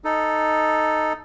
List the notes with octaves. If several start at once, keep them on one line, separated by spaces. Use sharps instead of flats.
D#4 A4